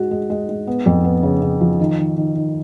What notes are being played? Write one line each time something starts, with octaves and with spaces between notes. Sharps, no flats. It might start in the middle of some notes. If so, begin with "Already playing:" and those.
Already playing: G#3 F#4
G#3
G#3
G#3
B3
F2
B3
C#3
C#3
F3
D#3
D#3
D#3
D#3